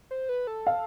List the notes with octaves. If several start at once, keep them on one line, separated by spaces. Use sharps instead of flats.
C5
B4
A4
F5